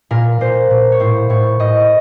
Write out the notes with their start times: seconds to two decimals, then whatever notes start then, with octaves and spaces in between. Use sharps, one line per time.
0.11 A#2 A#4
0.41 A#2 C5
0.70 A#2
0.92 C#5
1.00 A2 C5
1.30 A2 C#5
1.60 A2 D#5